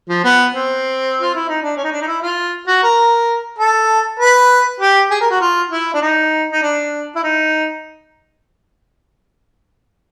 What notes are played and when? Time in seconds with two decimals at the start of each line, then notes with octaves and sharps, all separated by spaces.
0.09 F3
0.24 B3
0.55 C4
1.21 F4
1.35 E4
1.48 D#4
1.62 D4
1.77 C#4
1.84 D#4
1.92 D4
2.02 D#4
2.07 E4
2.22 F4
2.67 F#4
2.83 A#4
3.59 A4
4.20 B4
4.80 G4
5.11 G#4
5.21 A#4
5.31 F#4
5.41 F4
5.71 E4
5.94 D4
6.02 D#4
6.52 D#4
6.63 D4
7.16 E4
7.23 D#4